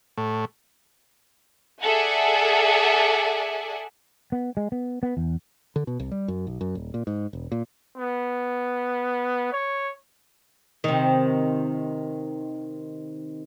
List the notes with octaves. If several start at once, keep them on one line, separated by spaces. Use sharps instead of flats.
A2
G#4 A4 D5 E5 F#5 G#5
B3
G#3
B3
B3
E2
D3
B2
C2
G3
F#2
B1
F#2
D#1
A#2
G#2
E1
A#2
B3
C#5
C3 D#3